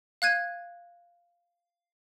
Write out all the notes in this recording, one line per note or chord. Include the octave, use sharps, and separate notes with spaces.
F5 F#6 G#6 D#7